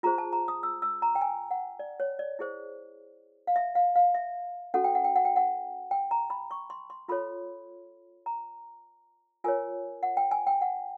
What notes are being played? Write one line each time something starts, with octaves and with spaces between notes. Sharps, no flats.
F4 G#4 C5 A#5
A5
A#5
D#6
E6
E6
A#5
G5
G#5
F#5
D5
C#5
D5
E4 G#4 C5
F5
E5
F5
F5
E5
C#4 F#4 A4 F#5
G5
F#5
G5
F#5
G5
F#5
G5
A#5
B5
C#6
C6
C6
F4 A4 C#5 B5
A#5
F4 A#4 C#5 G#5
F#5
G5
G#5
G5
F#5